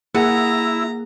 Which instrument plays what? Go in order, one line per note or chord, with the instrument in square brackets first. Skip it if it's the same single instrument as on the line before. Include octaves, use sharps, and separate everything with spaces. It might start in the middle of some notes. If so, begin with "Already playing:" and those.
[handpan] A#3 G#4 [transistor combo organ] E4 [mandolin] F#5 [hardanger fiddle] A#5